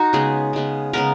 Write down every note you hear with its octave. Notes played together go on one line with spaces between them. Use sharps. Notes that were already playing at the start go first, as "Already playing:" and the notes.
Already playing: D#4 F#4
C#3 G#3 B3 G#4
C#3 G#3 B3
C#3 G#3 B3 A#4